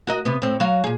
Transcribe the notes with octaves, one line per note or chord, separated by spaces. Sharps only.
F#4 A#4 D#5
C3 B3
A2 C4
F#3 F#4 F5
A#2 G#4